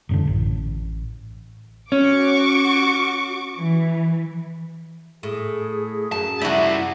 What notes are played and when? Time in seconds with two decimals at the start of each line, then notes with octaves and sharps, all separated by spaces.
0.09 E1 F#2 D3
0.27 A1
1.92 C#4 F#4 C#6 D6
3.57 E3
5.23 A2 G#4
6.12 F#2 A5
6.42 G3 E4 F#4 E5